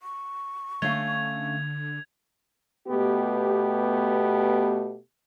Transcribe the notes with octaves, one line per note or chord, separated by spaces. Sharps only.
C#6
D3 A3 C#4 F5 G#6 F7
B2 A3 B3 G4